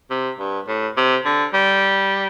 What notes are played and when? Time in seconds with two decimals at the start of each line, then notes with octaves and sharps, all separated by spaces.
0.10 C3
0.39 G2
0.68 A2
0.97 C3
1.25 D3
1.54 G3